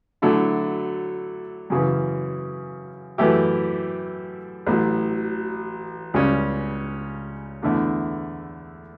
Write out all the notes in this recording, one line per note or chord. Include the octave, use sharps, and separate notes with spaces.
D3 F#3 A3 E4 A4
F#2 C#3 E3
F#2 E3 A3 E4 G4
A1 A2 F#3
C#2 C#3 G3 C#4
E2 D3 A3 E4